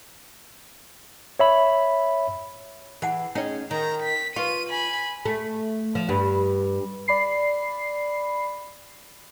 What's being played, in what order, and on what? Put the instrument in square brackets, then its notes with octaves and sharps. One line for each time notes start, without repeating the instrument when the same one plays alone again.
[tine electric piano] C#5 E5 B5
[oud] E3 [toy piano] G#4 F#5 G#5
[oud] C#4 D#4 G#4 [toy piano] C#5 G5
[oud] D#3 [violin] A#5
[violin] B6
[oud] F4 [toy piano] B4 C#6 [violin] D#7
[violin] G#5 B5
[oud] A3
F3
G2
[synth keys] D5 B5 C7